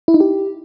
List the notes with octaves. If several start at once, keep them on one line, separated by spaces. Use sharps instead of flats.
E4
D#4
G4